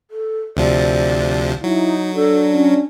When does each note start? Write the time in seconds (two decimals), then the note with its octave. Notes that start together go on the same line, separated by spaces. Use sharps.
0.11 A4
0.57 D2 C3 F3 D5
1.64 F#3 D#4 E4
2.15 D4 A4
2.52 C#4